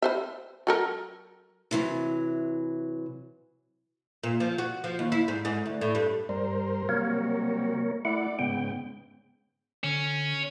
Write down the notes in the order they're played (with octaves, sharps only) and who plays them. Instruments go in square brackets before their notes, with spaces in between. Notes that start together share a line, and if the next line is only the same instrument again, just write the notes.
[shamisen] B4 C5 E5
F#3 A4 A#4
[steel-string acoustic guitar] C3 E3 F#3
[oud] A#2
F3
F#4
F3
D#2
E4
G#2
G#2
D2
A2
G2
[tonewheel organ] G2 G3 [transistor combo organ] A#4 C5
[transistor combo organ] C3 F#3 G3 [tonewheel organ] A#3 A#4 C#5
[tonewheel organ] A3 E4 F#5 [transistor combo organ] D5
[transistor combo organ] G#2 C#3 [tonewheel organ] B3 G5
[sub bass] D3 [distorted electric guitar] C#4